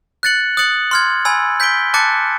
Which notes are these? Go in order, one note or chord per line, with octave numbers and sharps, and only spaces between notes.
F#6 A6 C#7 F#7
D#6 F#6 A6 C#7 F#7
C6 F6 G#6
G#5 B5 E6 G#6
G6 B6 D7 G7
A5 D6 F#6 A6 C#7